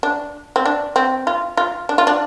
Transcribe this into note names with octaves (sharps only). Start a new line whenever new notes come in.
D4
C4
D4
C4
F4
F4
D4
F4
D4